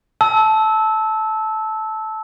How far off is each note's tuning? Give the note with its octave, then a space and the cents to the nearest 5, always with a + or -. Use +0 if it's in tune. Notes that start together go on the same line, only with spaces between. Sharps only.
A5 -10 E6 -15